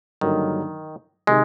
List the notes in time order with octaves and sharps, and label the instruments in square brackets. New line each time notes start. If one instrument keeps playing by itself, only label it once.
[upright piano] G2 D3 F#3 A#3 D#4 [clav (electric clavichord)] D#3
[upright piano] C3 D#3 [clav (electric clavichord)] G#3